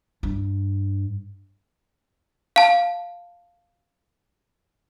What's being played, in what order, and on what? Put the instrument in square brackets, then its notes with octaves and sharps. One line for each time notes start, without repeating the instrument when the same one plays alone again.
[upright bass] G2
[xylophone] F5 A5